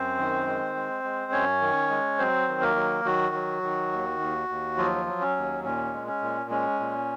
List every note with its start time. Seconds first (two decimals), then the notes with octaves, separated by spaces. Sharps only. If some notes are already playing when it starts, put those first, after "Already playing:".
Already playing: F#2 C4 C5
0.18 D#3
0.47 G#3
0.76 G#3
1.04 G#3
1.32 F#2 C#4 C#5
1.61 D#3
1.90 G#3
2.19 F#3 C4 C5
2.48 D#3
2.62 A#3 A#4
2.76 F#3
3.05 D#3 F#3 F#4
3.35 F#3
3.63 D#3
3.92 D#2
4.20 D#2
4.49 D#2
4.78 F3 F#3 F4
5.06 F#3
5.21 C#4
5.36 D#2
5.64 A#2 C#4
5.93 G#3
6.08 C#4
6.22 A#2
6.50 G#3 C#4
6.80 A#2